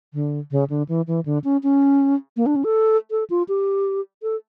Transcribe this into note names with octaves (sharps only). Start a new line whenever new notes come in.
D3
C#3
D3
E3
E3
D3
C#4
C#4
A#3
D4
C#4
A4
A4
F4
G4
A4